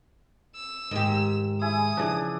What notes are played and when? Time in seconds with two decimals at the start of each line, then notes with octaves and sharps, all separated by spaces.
0.55 E6
0.91 G#2 D#3 G#3 G4
1.61 E4 G#4 D#6
1.97 C#3 E3 F3 D4